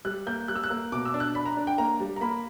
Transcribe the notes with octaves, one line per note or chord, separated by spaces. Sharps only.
G3 F#6
A#3 G6
G3 F#6
E6
F#6
A#3
B2 D6
E6
D4
F#6
D4 B5
A#5
D4
G5
A#3 A#5
G3
A#5
A#3 B5